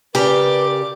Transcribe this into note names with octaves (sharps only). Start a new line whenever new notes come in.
C#3 G4 A#4 B4 D5 D6